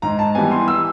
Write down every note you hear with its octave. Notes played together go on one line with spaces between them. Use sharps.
G#2 A#5
A5
E3 G3 B3 G#5
C6
E6